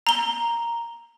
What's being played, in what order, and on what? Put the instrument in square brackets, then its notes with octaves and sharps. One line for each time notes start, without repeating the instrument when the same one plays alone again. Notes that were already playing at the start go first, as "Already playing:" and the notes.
[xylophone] A#5 G7